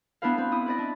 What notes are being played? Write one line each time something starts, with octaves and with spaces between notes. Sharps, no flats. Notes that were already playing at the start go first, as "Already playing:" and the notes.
B3 D4 E4 B4 F5
C4 B4
E4 D#6
B4 D5 D#5
D4